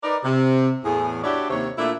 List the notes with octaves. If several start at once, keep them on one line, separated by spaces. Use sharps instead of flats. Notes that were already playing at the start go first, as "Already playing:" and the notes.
D#4 A#4 B4 D5
C3
E2 A2 G#4
D4 E4 F#4 G4 C#5 D5
D#2 C3 C#5
A#2 A3 D4 E4